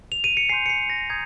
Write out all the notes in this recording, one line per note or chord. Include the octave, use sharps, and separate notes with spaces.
F7
D#7
C#7
G#5 C6 G6 C7
C#7
C7
A#6
A#5 D#6 G6 G#6